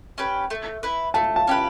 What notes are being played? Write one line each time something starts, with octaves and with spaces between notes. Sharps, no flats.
C#4 G4 B4
A3
E4 B4
A3 A5
A5
C#4 G4 B4